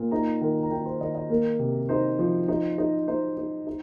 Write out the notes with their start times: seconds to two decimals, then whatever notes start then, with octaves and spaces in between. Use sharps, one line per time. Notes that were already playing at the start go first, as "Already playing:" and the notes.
Already playing: A#2
0.11 D#4 A#5
0.41 D#3
0.63 A#5
0.70 D#3 G5
0.85 C5
1.01 D#3 D#5
1.15 D#5
1.30 A#3
1.59 C3
1.89 D#4 C5
2.19 F3
2.48 D#4
2.78 D#4
3.08 D#4 C5
3.37 D#4
3.67 D#4